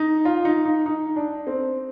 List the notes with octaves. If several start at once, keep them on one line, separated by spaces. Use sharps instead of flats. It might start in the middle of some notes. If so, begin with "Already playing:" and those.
Already playing: D#4
F4
D#4
D#4
D#4
D4
C4